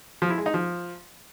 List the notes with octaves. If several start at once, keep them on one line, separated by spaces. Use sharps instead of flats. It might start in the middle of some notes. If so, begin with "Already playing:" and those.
F3
E4
G#3
D#4
F3